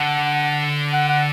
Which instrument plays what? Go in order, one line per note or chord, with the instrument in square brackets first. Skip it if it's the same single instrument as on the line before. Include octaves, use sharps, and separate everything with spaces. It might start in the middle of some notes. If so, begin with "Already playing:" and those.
Already playing: [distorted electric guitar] D3 [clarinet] F#5
[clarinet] F#5
F#5